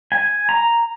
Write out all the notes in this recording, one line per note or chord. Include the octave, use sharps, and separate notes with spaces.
G#5
A#5